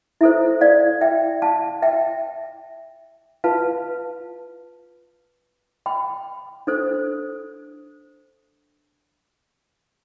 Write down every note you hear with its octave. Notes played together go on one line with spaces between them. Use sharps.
E4 A4 C5 E5
D5 F5
E5 G5
F5 A5
E5 G5
F4 B4 F5 A5
G5 B5
D4 A4 C5